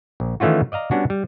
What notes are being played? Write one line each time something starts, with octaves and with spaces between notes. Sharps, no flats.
A#1
D#3 E3 A3 C#4 F4 F#4
D5 D#5 F5 A#5
G3 B3 C#4 D4 F#4
G3